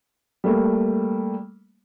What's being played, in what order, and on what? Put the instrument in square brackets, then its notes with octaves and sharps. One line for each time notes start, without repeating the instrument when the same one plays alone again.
[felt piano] G3 A3 A#3